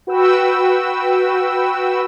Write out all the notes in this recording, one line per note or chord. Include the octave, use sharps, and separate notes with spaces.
F#4 B4 G5 E6